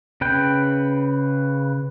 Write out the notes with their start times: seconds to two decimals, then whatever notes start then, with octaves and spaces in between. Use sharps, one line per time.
0.21 C#3 B4 G5